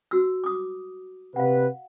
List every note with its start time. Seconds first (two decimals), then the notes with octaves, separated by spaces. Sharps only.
0.11 F#4 E6
0.44 D6 D#6
1.36 C3 B4 F5 F#5